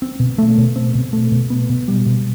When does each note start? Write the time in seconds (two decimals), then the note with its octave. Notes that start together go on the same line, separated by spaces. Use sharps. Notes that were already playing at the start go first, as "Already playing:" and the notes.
0.02 C4
0.20 B2
0.38 A3
0.58 B2
0.76 C4
0.95 B2
1.13 A3
1.32 B2
1.50 B3
1.70 B2
1.88 G3
2.06 B2